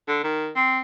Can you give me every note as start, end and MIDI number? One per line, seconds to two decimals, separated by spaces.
0.08 0.20 50
0.24 0.49 51
0.56 0.80 60